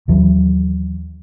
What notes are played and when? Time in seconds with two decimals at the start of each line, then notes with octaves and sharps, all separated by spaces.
0.08 D#2 E3 F#3